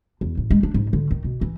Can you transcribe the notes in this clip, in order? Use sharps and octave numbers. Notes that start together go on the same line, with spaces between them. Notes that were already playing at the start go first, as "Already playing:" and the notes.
E2
A1
G#3
D4
G#2
D3
D#3
B2
E3